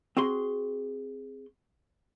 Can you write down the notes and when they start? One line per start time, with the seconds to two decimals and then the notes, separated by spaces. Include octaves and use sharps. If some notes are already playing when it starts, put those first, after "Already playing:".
0.17 C4 F#4 G#4 C6